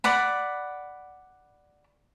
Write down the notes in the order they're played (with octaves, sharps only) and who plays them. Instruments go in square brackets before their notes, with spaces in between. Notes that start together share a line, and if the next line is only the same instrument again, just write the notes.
[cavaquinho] D5 F#5 B5